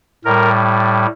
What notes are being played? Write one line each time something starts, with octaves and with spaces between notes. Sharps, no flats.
A2 G3 A#4